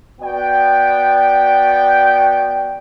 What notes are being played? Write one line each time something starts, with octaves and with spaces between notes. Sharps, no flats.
B3 F#4 D5 G5